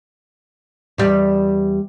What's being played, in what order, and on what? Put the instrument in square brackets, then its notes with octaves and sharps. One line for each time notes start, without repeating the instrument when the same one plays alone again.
[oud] E2 G3